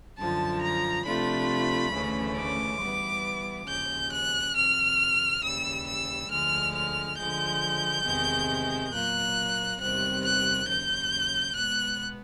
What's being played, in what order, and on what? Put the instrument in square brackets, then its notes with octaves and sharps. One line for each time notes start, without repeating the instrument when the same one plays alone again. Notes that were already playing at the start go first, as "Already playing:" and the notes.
[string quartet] F#2 D3 F3 [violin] A5
[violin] A#5
[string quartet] C3 F3 A3 D4 F4 [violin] B5
[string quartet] D2 C#3 E3 A3 C#4
[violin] D6
[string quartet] E3 G3 B3
[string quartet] D#2 C#3 F3 G#3 [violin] G6
[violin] F#6
[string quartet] F2 C3 D#3 [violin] F6
[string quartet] D#2 C#3 E3 G3 [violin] E6
[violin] E6
[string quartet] D2 D3 F3 G#3 [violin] F6
[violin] F6
[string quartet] D3 F3 G#3 [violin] G6
[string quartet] E2 C3 D#3 G#3
[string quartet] A#2 F#3 A#3 [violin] F#6
[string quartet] E2 C3 D#3 G3 C4 [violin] F#6
[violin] F#6
[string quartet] D#2 C#3 F#3 [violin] G6
[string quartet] B2 G#3 B3 [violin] F#6